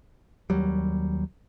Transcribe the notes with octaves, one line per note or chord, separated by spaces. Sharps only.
D#2 F#3 G3